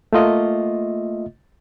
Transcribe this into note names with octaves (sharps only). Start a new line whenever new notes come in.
A3 A#3 F4 D#5 E5